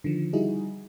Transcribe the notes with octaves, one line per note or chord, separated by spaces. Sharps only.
D3 D#3 F3
G3 D#4 E4 F#4 G#4